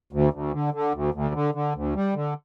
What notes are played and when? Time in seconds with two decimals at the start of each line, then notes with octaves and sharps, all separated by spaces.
0.13 D2
0.33 D2
0.53 D3
0.74 D3
0.94 D2
1.14 D2
1.34 D3
1.54 D3
1.75 D2
1.95 G3
2.15 D3